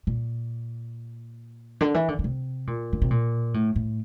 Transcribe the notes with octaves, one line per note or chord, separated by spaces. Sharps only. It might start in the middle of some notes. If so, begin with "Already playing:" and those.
A#2
D3
E3
D3
D3
C3
A#2
D3
C3
A#2
A2
A2